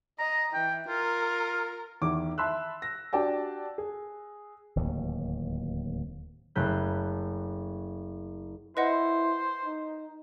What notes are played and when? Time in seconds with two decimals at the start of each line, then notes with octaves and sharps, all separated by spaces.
0.19 D#5 A#5
0.54 E3 G5
0.89 F4 A#4
2.02 E2 D#3 E4 D6
2.38 E5 A5 B5 C6 E6 F#6
2.82 A#6
3.13 D4 F#4 G4 D5 G5 A5
3.78 G#4
4.76 D1 D#2
6.55 F#1 A3 B5 F#6 G6
8.77 E4 B4 C5 D#5 F#5
9.65 D#4